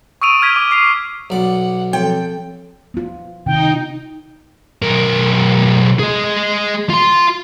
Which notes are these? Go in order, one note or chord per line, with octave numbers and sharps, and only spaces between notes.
C#6 D#6 E6 D7 D#7 F7
F6 G#6 B6
D6
D6 C7 D#7 F7
B1 D5 F#5
F3 C4 A4 C#5 G5
B3 F4
C3 D#3 D#4 G5
B1 A#4
G#3 G#4
F4 C6